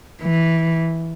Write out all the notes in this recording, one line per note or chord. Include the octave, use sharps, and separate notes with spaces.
E3